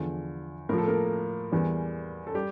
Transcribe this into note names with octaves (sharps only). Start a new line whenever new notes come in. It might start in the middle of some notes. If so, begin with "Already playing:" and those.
Already playing: E2 D3 F3
A2 F3 A#4
A4
A#3 A#4
E2 E3 G3
A4
G3 G4